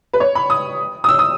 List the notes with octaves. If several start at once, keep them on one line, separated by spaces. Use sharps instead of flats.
B4
C#5
B5
D#6
D#6
E6
D#6